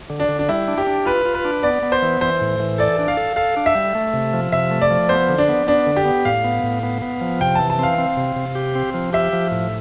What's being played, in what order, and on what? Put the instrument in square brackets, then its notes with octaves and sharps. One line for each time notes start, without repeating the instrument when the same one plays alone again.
[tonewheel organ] D3
[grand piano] D4
[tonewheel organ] D3
[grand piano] D4
[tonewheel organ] G3 [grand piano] E4
[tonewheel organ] D4
[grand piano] G4
[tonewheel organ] D4
[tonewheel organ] F4 [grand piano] B4
[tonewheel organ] F4
[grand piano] B4
[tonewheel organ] D4
[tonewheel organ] B3 [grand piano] D5
[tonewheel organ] B3
[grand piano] C5
[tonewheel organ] E3
[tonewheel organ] E3 [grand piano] C5
[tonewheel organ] A2
E3
[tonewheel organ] A4 [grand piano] D5
[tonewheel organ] D4
[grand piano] F5
[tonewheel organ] A4
[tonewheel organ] A4 [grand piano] F5
[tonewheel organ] D4
[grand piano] E5
[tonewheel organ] G3
A3
C3
F3
[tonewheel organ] C3 [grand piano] E5
[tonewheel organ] A3
[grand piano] D5
[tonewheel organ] F3
[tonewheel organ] B3 [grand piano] C5
[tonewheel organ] D3
[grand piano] D4
[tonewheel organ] B3
[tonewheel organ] B3 [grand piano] D4
[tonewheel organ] D3
[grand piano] G4
[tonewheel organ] B3
[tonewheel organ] A2 [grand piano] F5
[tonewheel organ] B3
A2
B3
B3
F3
[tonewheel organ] C3 [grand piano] G5
[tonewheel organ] E3 [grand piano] A5
[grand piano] A5
[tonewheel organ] C4 [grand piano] F5
[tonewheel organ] C4
C3
C3
G4
C4
F3
[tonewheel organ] G4 [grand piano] E5
[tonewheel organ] F3
A2